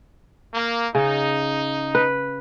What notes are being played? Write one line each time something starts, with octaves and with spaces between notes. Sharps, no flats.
A#3
C#3 D#4
B4